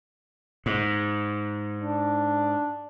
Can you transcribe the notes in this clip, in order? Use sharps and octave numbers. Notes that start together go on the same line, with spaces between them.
G#2
D4